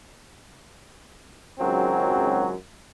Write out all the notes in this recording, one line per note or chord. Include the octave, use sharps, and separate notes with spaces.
G#1 C#2 F#2 F#3 C4